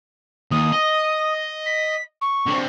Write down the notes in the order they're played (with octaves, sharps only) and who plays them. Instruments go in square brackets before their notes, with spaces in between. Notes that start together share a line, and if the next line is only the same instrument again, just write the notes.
[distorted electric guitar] D#2 [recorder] D#6
[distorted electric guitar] D#5
[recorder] B6
C#6
[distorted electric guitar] D3 C4